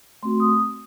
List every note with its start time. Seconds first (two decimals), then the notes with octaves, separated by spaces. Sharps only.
0.23 A3 C4 F#4 C6
0.40 D#6